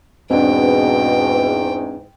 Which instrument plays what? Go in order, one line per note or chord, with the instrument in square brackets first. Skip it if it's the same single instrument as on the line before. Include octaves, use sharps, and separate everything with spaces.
[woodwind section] E2 G#2 [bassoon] B2 [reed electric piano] C4 D4 [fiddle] G5